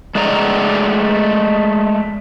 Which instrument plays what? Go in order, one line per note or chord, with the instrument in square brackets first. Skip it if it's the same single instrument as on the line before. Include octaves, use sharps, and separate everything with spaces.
[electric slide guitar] G#3 A3 G#4 D5 A5 A#5